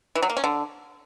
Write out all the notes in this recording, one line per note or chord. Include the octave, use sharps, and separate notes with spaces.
E3
F#3
A#3
C#4
D3